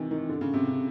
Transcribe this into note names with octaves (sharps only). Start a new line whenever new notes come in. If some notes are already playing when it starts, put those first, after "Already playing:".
Already playing: C3 D#3 E3
D#3
D3
C#3
C3
C#3